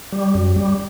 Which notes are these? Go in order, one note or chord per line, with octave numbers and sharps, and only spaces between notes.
G3
F#2
G3